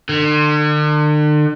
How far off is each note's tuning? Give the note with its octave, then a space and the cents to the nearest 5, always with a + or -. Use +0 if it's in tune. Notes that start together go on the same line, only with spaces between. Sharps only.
D3 +40